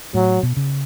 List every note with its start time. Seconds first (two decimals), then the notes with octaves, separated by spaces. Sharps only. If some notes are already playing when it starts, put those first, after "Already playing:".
0.14 A2 F#3
0.43 B2
0.57 C#3